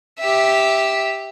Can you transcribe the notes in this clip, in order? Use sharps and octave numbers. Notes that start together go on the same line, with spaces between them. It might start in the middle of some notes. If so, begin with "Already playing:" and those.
G4 E5